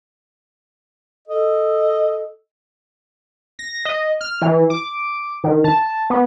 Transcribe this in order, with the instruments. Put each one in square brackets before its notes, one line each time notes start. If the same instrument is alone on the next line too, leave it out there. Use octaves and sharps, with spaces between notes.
[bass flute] A4 [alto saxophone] D#5
[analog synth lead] A#6
D#5
F6
E3
D6
D#3
A5
B3